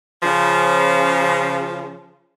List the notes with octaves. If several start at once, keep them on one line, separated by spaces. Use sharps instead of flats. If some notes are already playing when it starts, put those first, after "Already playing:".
C#3 F3